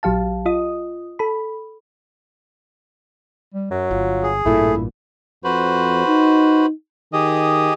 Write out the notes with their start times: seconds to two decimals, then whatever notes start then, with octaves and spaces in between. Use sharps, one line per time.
0.03 A#1 F#3 G4 F5 A5
0.46 F4 D#5 D#6
1.19 A4 B5
3.54 G3
3.71 F#2 F#3
3.91 G1 F4
4.23 G#4
4.45 A1 G2 A#2 A3 E4
5.44 F2 F#4 B4 C5
6.07 D#4
7.13 D#3 G4 G#4 D#5